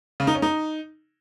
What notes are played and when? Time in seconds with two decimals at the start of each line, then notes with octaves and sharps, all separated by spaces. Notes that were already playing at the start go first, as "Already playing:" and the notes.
0.20 C#3
0.27 D#4
0.35 C#4
0.42 D#4